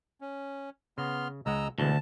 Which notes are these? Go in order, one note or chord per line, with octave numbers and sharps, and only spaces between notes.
C#4
C#3 B3 C6 F6
C#2 G#3 D#5 F#5 A#5 E6
D2 B2 D3 E3 G#3 A5